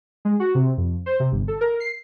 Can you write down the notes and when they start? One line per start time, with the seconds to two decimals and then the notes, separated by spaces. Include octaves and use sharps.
0.25 G#3
0.40 F#4
0.55 C3
0.77 F2
1.06 C5
1.20 C3
1.32 G1
1.48 A4
1.61 A#4
1.80 C7